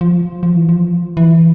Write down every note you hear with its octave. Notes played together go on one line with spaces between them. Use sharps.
F3
F3
E3
F3
E3